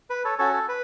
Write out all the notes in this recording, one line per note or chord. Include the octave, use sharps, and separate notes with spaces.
B4
A4 C#5
C#4 F#4 A4 C#5
A4
B4